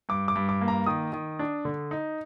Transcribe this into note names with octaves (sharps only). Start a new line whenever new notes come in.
G2 D6
D6
G2
D6
A#3
A#5
D#3 D#6
D#3
D4
D3
D#4